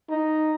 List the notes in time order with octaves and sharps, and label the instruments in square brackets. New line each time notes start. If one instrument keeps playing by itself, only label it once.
[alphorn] D#4